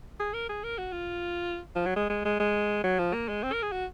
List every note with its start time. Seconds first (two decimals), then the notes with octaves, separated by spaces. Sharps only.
0.20 G#4
0.34 A#4
0.49 G#4
0.64 A#4
0.78 F#4
0.92 F4
1.76 F3
1.86 F#3
1.96 G#3
2.10 G#3
2.25 G#3
2.40 G#3
2.84 F#3
2.99 F3
3.14 A#3
3.29 G#3
3.43 C4
3.53 A#4
3.63 G#4
3.72 F#4